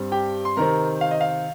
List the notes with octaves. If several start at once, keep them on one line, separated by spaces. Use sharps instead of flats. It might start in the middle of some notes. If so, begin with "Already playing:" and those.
Already playing: G2 G3 C4
G4 G5
C6
C3 D#3 C4 A#4 A#5
F5
D#5
F5